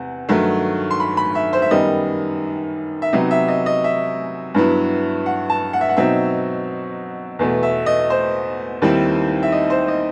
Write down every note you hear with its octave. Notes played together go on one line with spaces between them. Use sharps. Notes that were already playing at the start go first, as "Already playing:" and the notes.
Already playing: E2 C3 F#5
G2 D#3 F#3 A3
C6
B5
B5
E5
C5
E5
F#2 D#3 G3 B3 D#5
E5
C3 F#3 B3 D#4 D#5
E5
D#5
D#5
E5
G2 F#3 B3 E4
F#5
A5
F#5
E5
F#5
B2 F#3 C4 D#4 E5
E2 B2 A3
E5
D#5
C5
D#2 D#3 G3 C4 E4
E5
D#5
C5
D#5